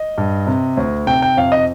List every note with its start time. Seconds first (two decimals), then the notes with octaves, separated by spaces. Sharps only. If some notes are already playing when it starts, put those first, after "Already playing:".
Already playing: D#5
0.18 G2
0.47 C3
0.77 D2
1.07 C3 G5
1.22 G5
1.37 F2 F5
1.52 D#5